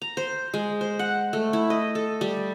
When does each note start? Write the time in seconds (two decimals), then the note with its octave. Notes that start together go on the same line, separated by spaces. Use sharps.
0.02 A#5
0.17 C5
0.54 G#3
0.81 C5
0.99 F#5
1.33 A3
1.53 E4
1.70 D#5
1.95 A4
2.21 G3